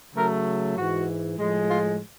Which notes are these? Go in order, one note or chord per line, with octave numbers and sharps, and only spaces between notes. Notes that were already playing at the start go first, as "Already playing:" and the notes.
C#3 F#3 A3 A#4
G#2 E3 G#3 F#4
A2 F3 G#3
F4